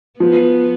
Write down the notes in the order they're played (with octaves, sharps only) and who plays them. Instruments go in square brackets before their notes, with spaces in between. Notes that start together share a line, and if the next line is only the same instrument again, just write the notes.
[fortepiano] F3 [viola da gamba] B3